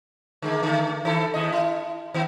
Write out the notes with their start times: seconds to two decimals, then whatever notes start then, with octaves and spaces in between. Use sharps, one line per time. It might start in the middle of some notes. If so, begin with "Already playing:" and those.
0.42 D3 G#3 A#3
0.63 D3 A3
1.05 D#3 E4 A4
1.34 D#2 E4 D#5
1.52 E4
2.14 D#3 B3